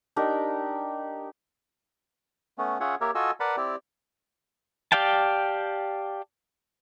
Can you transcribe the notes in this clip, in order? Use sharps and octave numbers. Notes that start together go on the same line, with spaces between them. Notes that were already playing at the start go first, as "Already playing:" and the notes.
D4 D#4 G4 A#4
A3 B3 C#4
C#4 F4 G#4 C#5 E5 F#5
A#3 G4 A#4 C#5 E5
F4 F#4 A4 D#5 G#5 E6
A#4 B4 D5 F#5 A5 B5
C4 E4 G4 D5
G4 D5 F5 G5 A5